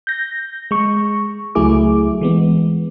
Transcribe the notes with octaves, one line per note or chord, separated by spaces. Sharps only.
G6 A#6
G#3 C#6
C#2 F#3 A3 E4 G#4 D6
E3 G#3 B3